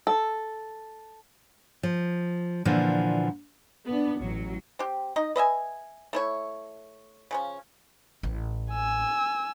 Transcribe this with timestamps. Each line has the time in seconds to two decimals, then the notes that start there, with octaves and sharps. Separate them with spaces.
0.07 A4
1.83 F3
2.65 A#2 D3 E3 F3
3.86 B3 D4
4.21 A1 F#3
4.79 C4 G4
5.16 D#4 D#5
5.36 B4 D#5 E5 G#5
6.13 A3 E4 C#5
7.31 C#3 F3 C#4
8.23 A1
8.71 G#5 E6